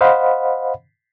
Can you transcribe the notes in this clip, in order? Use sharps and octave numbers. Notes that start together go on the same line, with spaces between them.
C5 D#5 F5 F#5 B5